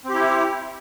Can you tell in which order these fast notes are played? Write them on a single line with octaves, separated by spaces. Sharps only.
C4 G4 E4